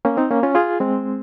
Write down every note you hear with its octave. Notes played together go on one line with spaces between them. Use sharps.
A#3 C#4
C4 D#4
A#3 C#4
C#4 F4
F4 G#4
G#3 C4